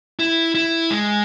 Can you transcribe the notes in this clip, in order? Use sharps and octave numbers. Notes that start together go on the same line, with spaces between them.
E4
E4
G#3